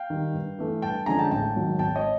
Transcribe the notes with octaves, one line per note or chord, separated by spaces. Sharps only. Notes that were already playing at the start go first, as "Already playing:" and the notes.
Already playing: F5 G5
D#3 G3
G2
E3 A3
G2 G5 A5
D3 F3 G#3 C#4 G#5 A#5
G5 A5
A1 G5 A5
G#2 D#3 F#3
G#1 G5 A5
C#5 D#5